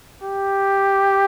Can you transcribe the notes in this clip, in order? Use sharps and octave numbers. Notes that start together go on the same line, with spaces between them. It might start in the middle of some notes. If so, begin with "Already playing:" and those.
G4